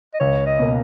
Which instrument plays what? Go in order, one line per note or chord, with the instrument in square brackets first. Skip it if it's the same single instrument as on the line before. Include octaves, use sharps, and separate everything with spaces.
[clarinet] D#5
[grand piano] C#2 [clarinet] C#5
[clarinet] D#5
[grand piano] B2 A#3